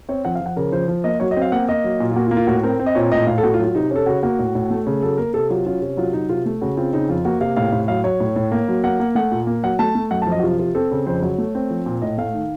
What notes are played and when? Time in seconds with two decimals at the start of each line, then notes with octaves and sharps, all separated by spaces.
0.09 C4 C#5
0.25 F3 F#5
0.35 F5
0.41 F3
0.46 F#5
0.56 C#3 A#4
0.72 F3 C5
0.88 F3
1.04 A#3 D#5
1.20 F#3 C#5
1.31 D#5
1.37 C4
1.42 F5
1.52 A#3 F#5
1.69 A#3 D#5
1.84 F#3
2.00 A#2
2.11 F4
2.16 A#3 F#4
2.27 F4
2.31 A#3
2.37 F4
2.47 A2 F#4
2.63 C4 A#4
2.80 C4
2.86 D#5
2.95 A#2 C#5
3.11 A2 D#5
3.27 A2 F5
3.38 A4
3.43 A3 F#4
3.54 F4
3.59 F#3
3.64 F4
3.75 C3 D#4
3.91 C#4 A4
4.06 C#3 F#4
4.23 A#3 F#4
4.39 A2
4.55 A2
4.71 A3
4.86 C#3
5.02 F#3 A4
5.18 A#3 A#4
5.33 C3 A4
5.50 F#3 F4
5.66 C#4 F4
5.82 C3
5.97 F#3 F4
6.13 F#3 D#4
6.29 C3 F4
6.46 A3
6.61 C#3 F#4
6.77 C4 F4
6.93 C#3 D#4
7.09 F2 F4
7.25 A#3 F#4
7.41 C3 F5
7.57 A2 F5
7.72 A2
7.88 F#3 F5
8.04 F#3 C#5
8.20 A2
8.36 A2
8.52 A#3
8.68 F#3
8.84 A#3 F#5
8.99 A#3
9.15 A3 F#5
9.31 A#2
9.47 A#3
9.63 F#3 F#5
9.79 A3 A5
9.95 A3
10.11 F#2 F#5
10.22 A5
10.27 F3
10.32 D#5
10.39 F#4
10.43 C3 F4
10.59 C3 F4
10.75 C4 A4
10.91 C#3
11.07 F2 C5
11.22 F#3 C#5
11.38 A3
11.55 C4
11.70 F3
11.86 A#2
12.02 A2 D#5
12.18 A3 F5
12.34 D#3